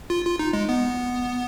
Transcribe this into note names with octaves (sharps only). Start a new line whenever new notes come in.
F4
F4
D#4
G#3
B3